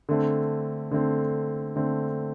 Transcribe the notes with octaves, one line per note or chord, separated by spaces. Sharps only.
D3 A3 C4
D3 A3 C4
D3 A3 C4